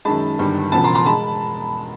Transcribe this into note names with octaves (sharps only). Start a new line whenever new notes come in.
F#2 D#3 G#3 A5 B5
G1 G2 D#3 G3
E1 E2 C#3 F3 A5 B5
A#5 C6
A#5 C6
G#3 A5 B5